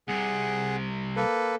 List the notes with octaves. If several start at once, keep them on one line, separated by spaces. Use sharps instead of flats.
C2 C3 G#4 F#5
A#3 A4 B4